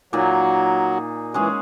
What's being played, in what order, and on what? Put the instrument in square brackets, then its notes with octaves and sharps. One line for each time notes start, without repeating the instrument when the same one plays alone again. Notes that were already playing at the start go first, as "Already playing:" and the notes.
[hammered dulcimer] A#2 A#3 D#4 G#4 [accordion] F#3
[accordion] E3 [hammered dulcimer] G#3 C#4 G#4